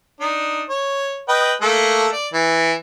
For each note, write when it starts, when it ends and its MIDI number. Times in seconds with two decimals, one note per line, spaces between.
0.20 0.64 62
0.20 0.64 63
0.69 1.22 73
1.28 1.53 71
1.28 1.53 75
1.28 1.53 79
1.61 2.11 57
1.61 2.11 58
1.61 2.11 69
2.12 2.28 74
2.34 2.73 52